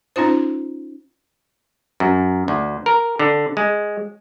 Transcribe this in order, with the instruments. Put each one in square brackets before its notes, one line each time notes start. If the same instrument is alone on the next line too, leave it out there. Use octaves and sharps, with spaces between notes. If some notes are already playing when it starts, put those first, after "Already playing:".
[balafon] C#4 D#4 F4 C5
[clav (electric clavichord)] F#2
D2
A#4
D3
G#3